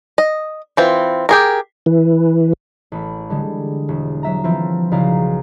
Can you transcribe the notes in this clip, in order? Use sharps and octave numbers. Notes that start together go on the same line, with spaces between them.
D#5
E3 C4 F4
G4 G#4 A#4
E3
A1 A3 B5
D3 G3 G#3
E1
F#3 E5 A#5
E3 F3 C4 E4 F4
B1 C#3 E4 D5 F5 A#5